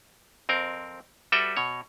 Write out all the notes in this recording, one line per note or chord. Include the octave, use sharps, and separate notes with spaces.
F2 C4 A#4
G3 F#4 A4 B4 E5 G5
B2 C#5